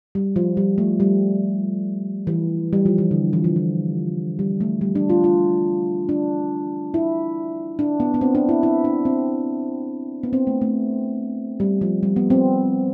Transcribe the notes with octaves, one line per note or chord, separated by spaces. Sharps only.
G3
F3
G3
A3
G3
E3
G3
F3
E3
D3
E3
F3
E3
G3
A3
G3
D4
F4
F4
D4
E4
D4
B3
B3
C4
D4
E4
E4
D4
C4
B3
C4
A3
A3
G3
F3
G3
B3
C4